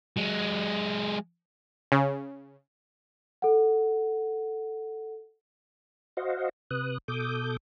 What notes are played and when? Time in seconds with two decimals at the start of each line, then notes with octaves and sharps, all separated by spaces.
0.17 F#3 G#3
1.92 C#3
3.42 A4 F#5
6.17 F#4 C5 D#5 F5 F#5
6.71 C3 B4 D#6 F#6
7.08 B2 A4 D6 D#6 G6